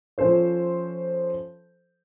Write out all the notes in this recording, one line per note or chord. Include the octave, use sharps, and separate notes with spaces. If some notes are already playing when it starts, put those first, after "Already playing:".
F3 C#4 A4 C5 C#5